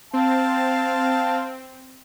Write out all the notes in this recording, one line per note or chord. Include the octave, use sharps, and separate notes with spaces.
C4 F5 A5